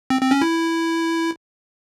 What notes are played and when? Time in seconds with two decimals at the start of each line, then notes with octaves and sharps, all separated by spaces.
0.10 C4
0.21 C4
0.31 C#4
0.42 E4